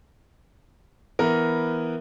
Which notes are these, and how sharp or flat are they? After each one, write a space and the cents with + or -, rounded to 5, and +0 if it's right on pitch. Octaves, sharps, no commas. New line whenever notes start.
E3 +0 B3 +0 A#4 +0